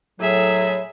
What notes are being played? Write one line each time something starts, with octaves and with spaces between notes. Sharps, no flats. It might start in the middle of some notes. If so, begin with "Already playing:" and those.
A2 F#3 G#4 E5